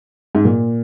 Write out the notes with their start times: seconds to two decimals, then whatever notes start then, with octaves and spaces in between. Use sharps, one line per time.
0.35 G#2
0.45 A#2